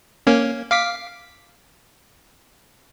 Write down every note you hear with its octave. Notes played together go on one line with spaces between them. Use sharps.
A#3 C#4
F5 D6 B6